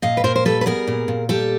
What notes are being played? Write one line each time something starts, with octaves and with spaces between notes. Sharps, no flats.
A#2 D#5 F5
B4
A#2 A#4 C5
C5
G3 A4 B4
B4
B3 G#4 A#4
A#2
A#2
G3 G4 A4